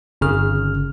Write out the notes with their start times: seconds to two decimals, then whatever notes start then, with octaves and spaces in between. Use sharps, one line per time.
0.21 G1 C#3 F6